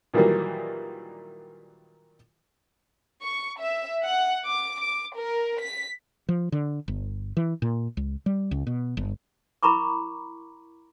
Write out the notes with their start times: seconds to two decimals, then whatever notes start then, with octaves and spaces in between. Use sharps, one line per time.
0.14 A#2 D#3 E3 F#3 G3 A#3
3.22 C#6
3.60 E5
4.02 F#5
4.46 D6
4.81 D6
5.17 A#4
5.61 B6
6.29 F3
6.52 D3
6.88 G1
7.37 E3
7.62 A#2
7.97 C#2
8.26 G3
8.51 C#2
8.67 B2
8.97 G1
9.63 E4 A#4 A#5 B5 C#6 D6